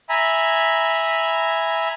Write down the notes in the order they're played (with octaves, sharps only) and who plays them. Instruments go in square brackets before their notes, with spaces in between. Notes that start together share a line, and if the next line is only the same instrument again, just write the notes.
[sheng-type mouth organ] E5 G#5 A#5 B5